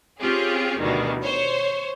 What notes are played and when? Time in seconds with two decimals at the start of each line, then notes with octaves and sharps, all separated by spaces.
0.21 C4 C#4 F4 G4 G#4
0.78 D2 B2 D#3 E3 G3
1.24 C5 C#5